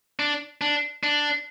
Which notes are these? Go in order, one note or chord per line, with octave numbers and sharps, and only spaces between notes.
D4
D4
D4